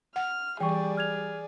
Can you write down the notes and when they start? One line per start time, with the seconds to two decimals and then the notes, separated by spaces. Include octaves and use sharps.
0.16 F#5 F6
0.60 E3 G3 G#4 D5 G5 C#6
0.97 F6 G#6 F7